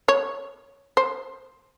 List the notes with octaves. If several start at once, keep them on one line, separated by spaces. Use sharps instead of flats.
C#5
C5